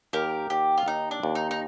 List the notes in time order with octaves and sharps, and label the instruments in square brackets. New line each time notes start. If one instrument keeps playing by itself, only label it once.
[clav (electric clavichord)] D#2 [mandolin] G4 A#4
[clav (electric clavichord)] D#2 [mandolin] G4
[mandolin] F4
[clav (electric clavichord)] D#2 [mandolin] D#4
[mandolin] D4
[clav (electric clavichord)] D#2
[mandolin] D#4
D#4